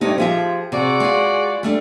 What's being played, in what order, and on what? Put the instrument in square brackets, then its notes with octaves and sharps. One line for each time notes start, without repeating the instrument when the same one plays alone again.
[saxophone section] G2 C3 [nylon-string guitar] A3 D#4
[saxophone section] F3 [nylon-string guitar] G4 G#4 E5
[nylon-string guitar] C3 [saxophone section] F#4 G#4 D5
[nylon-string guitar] G#3 F4
G3 A3 D4